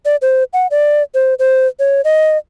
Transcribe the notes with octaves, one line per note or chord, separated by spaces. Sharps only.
D5
C5
F#5
D5
C5
C5
C#5
D#5